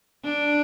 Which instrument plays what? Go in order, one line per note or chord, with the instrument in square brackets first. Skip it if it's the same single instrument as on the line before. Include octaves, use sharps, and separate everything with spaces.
[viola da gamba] D4